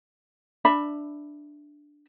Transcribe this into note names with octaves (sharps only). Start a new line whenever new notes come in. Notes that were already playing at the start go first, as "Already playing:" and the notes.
D4 E5 B5